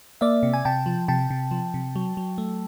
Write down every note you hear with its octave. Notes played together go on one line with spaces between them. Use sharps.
A#3 D5 E5
C3
G#5
C3 G5 A5
F3
C3 G5 A5
C3
F3
C3
F#3
F#3
A3